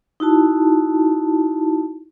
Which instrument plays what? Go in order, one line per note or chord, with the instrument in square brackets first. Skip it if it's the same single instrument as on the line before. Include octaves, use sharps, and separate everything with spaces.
[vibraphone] D#4 E4 F#4 A5